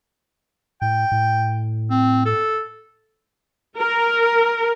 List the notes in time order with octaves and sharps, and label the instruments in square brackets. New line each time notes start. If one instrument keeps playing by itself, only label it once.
[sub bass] A2 [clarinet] G5
[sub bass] A2
[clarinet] C4
A4
[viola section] A#4